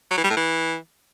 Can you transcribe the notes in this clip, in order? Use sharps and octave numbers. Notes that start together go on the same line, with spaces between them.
F#3
E3
G3
A2
E3